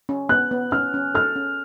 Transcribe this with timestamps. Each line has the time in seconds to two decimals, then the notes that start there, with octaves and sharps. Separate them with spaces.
0.09 C#4
0.29 B3 F#6
0.51 B3
0.72 C#4 F6
0.94 C#4
1.14 A4 F6
1.36 C#4